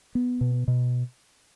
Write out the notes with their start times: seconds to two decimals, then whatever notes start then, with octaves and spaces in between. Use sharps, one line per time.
0.15 B3
0.41 B2
0.68 B2